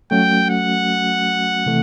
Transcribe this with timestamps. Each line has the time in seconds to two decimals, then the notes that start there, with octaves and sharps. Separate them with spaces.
0.11 F#3 A3 C#4 F#4 G5
0.50 F#5
1.66 C3 E3 A3